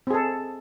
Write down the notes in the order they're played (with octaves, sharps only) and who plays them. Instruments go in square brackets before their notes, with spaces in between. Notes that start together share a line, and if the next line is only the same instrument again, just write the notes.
[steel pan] C4
G#4
A4